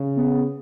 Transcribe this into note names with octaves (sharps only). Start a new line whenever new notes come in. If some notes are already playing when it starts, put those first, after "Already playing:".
Already playing: C#3
B3